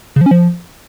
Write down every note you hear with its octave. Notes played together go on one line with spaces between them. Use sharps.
C#3
F3
C#4
F3